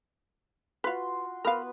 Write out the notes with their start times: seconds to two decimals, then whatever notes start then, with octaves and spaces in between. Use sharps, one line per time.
0.84 F4 F#4 B4 F5 C6
1.45 B3 A#4 B4 F5